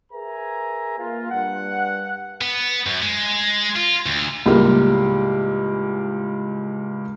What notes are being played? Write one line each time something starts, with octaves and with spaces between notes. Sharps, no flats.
G#4 A#4 B4 E5 G#5 A#5
A#3 F4
G2 F#5
B3
F#2
G#3
F4
D2
C#2 A2 G3 G#3 A#3